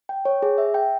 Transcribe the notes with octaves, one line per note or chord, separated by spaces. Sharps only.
G5
C#5
G#4
E5
G5